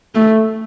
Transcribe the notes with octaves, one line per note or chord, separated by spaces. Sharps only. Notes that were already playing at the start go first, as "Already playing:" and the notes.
A3